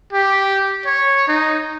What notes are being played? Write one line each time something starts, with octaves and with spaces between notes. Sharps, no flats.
G4
C#5
D#4